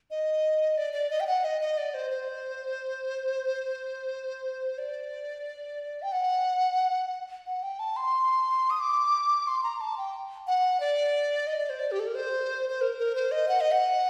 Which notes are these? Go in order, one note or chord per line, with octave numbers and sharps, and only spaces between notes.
D#5
D5
D5
D#5
G5
F#5
D#5
D#5
D5
C5
C5
D5
G5
F#5
F#5
G5
A5
C6
D#6
D6
C6
A#5
A5
G5
F#5
D5
D#5
D5
C5
D5
G4
A4
A#4
C5
C5
A#4
A#4
C5
D#5
F#5
D#5
F#5